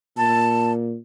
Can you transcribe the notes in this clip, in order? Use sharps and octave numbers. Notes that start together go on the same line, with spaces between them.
A#2 A5